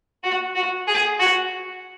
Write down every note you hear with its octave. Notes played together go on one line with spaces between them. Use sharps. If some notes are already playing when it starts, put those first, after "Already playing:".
F#4
F#4
G#4
F#4